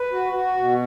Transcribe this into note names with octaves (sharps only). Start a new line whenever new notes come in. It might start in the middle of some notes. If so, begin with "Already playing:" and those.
Already playing: B4
F#4
F#4
B2